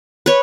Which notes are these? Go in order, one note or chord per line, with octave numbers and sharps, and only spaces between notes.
B4 C#5